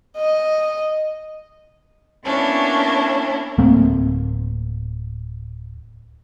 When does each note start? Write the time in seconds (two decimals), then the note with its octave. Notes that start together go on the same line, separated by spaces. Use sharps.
0.17 D#5
2.25 A#3 B3 C#4 D4 E4
3.58 D1 A3 A#3 C4